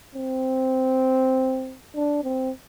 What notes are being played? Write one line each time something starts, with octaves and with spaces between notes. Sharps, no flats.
C4
D4
C4